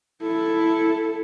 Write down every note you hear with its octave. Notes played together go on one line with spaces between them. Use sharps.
E4 A4